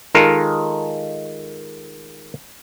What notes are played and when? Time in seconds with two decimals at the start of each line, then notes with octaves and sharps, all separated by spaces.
0.15 D#3 G#3 D#4 F4 A4 A#4